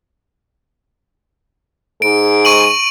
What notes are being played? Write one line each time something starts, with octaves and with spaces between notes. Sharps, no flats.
G#2 G#4 D7
C#6 D#7 F#7